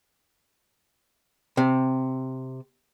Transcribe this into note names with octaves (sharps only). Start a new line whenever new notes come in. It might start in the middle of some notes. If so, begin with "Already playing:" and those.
C3